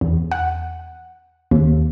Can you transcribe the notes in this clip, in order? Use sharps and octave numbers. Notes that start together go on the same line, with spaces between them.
E2
F#5
D#2